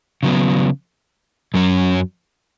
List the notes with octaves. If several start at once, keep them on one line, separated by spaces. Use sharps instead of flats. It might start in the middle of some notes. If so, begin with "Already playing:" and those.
C#3 F#3 B3
F#2 F#3 C#4